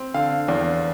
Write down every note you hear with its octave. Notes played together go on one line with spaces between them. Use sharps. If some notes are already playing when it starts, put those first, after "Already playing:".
Already playing: C4
D3 F5
E2